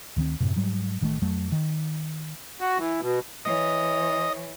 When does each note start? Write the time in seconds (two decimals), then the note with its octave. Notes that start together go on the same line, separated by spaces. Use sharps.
0.16 D2 D#3 G#3 C4
0.40 F#2 A2 C3
0.56 G#2 F#3 G3
1.01 A1 D#3 F3 A3
1.22 F2 F#3 A3
1.52 D#3
2.61 F#4
2.78 E3
3.01 B2
3.45 E3 C#5 D#5